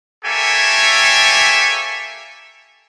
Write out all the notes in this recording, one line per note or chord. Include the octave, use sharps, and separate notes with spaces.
A#3 G4 A4 C#5 E5 G#5